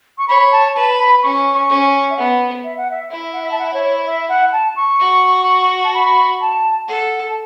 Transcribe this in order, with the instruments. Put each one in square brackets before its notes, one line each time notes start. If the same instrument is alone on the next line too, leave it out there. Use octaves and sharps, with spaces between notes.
[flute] C#6
[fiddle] C#5 [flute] B5
[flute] A5
[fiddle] B4 [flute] A5
[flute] B5
[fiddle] C#4 [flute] C#6
[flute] C#6
[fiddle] C#4
[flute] E5
[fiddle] B3 [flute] F#5
[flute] E5
F#5
E5
[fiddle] E4 [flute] E5
[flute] F#5
E5
A5
F#5
E5
C#5
E5
F#5
A5
C#6
[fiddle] F#4
[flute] A5
B5
A5
[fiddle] A4 [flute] F#5
[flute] A5